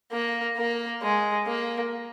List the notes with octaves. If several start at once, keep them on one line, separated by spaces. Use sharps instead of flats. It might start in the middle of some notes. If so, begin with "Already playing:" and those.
A#3
A#3
G#3
A#3